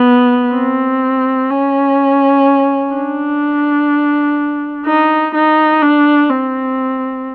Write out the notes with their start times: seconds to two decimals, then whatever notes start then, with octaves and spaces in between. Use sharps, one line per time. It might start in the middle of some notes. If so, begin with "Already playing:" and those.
Already playing: B3
0.54 C4
1.50 C#4
2.94 D4
4.86 D#4
5.34 D#4
5.82 D4
6.30 C4